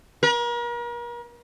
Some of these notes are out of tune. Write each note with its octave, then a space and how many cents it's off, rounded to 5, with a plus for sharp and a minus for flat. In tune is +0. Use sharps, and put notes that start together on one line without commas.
A#4 +40